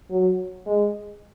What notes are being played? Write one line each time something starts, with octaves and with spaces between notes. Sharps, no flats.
F#3
G#3